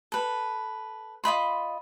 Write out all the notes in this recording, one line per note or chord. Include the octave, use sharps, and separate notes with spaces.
A4 B4
F4 D#5 B5 C6